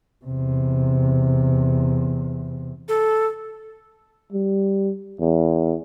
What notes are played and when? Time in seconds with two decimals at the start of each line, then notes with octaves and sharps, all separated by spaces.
0.25 E2 C3
2.88 A4
4.32 G3
5.20 E2